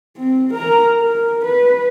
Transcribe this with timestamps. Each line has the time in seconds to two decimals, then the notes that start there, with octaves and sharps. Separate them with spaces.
0.17 C4
0.54 A#4 A#5
1.01 A#4
1.45 B4